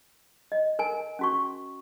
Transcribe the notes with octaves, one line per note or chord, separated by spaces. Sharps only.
D#5
A#4 G#5
C#4 F#4 C#6